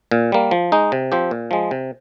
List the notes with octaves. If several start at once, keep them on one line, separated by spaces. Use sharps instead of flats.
A#2
G3 A#3
F3
G#3 D#4
C3
F3 C4 G4
A#2
F3 G#3
C3